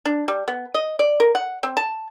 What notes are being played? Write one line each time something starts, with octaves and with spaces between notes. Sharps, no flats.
D4
G3
B3
D#5
D5
A#4
F#5
C4
A5